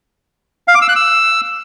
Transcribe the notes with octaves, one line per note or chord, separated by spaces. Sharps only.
F5
D6
E6
F#6
E6